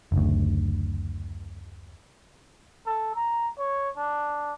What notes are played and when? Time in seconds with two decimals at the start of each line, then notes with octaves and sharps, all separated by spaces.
0.12 F#1 D2
2.86 A4
3.15 A#5
3.58 C#5
3.97 D4